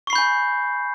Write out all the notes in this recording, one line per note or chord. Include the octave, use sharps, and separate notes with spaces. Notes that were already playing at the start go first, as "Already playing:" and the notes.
G#5 B5 C#6 G6 C7